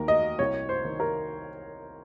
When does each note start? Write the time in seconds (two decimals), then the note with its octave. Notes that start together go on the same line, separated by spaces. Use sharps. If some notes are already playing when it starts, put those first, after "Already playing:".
Already playing: D#2 A#4
0.08 D#5
0.39 C2 C#5
0.69 C5
0.85 D#3
1.00 A#4